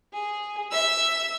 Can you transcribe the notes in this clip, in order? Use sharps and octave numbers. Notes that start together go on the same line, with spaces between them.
G#4
E5 E6